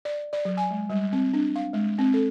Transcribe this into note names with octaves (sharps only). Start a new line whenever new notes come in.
D5
D5
F#3
G#5
G#3
G3
C4
D4
F5
G#3
C4
A4